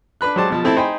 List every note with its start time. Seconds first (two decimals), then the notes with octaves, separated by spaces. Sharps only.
0.21 D4 B4 B5 F#6
0.36 F#3 G#3 G4 C5 D5 A5
0.50 B2 F3 A5
0.64 A3 C4 E4 A5
0.76 D#4 C5 G5 G#5 B5